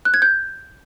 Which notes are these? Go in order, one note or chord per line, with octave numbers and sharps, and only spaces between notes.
F#6
G#6
G6